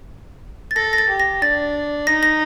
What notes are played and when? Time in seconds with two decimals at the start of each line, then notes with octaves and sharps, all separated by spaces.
0.71 A6
0.76 A4 A#6
0.93 A#6
0.98 A6
1.09 G4
1.20 A#6
1.42 D4 A6
2.07 D#4 A#6
2.23 A#6